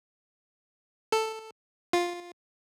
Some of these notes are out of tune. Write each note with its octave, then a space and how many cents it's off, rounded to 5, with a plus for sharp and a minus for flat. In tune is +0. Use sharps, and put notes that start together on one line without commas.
A4 +5
F4 +5